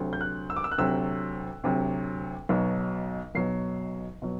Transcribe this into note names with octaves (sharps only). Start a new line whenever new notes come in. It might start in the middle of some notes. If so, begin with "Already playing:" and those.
Already playing: D2 C3 F#3
G6
F#6
E6
D6
E6
F#6
D2 C3 F#3 E6
D2 C3 F#3
B1 B2 F#3
B1 B2 F#3 C7
B2 F#3